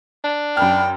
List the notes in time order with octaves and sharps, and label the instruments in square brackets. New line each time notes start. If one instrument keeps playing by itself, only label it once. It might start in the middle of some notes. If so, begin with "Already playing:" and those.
[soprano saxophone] D4
[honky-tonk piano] F#2 B5 F6 [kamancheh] G5